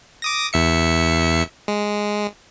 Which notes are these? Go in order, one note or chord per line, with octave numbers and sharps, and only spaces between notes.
D6 D#6 A#6
E2 E5 C#7
G#3